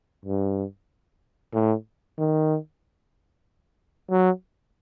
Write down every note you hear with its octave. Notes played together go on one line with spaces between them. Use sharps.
G2
A2
D#3
F#3